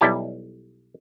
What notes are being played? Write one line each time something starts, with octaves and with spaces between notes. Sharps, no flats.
B1 G3 E4 G4 A5